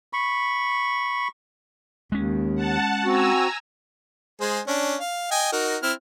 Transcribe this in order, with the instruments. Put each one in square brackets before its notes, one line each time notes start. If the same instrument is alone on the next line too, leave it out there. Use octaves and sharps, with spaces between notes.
[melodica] B5 C#6
[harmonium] D#2 [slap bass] G#3 C#4
[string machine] F#5 A5
[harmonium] C4 F#4 [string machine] G#5 A#5 E6
[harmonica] G#3 G#4 C5
C#4 D4
F5
D#5 G5 G#5
D#4 F#4 A#4
C4 E4 F6